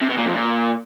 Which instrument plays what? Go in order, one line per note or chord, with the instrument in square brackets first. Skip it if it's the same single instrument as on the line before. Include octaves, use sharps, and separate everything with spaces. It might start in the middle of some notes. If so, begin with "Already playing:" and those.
[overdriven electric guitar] C3
B2
A#2
F2
A#2